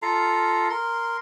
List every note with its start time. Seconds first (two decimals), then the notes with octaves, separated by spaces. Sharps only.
0.02 F4 A4 F5 A#5
0.70 A#4 C6